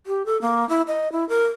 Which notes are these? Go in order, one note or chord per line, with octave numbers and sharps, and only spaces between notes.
G4
A4
A#3
E4
D#5
E4
A#4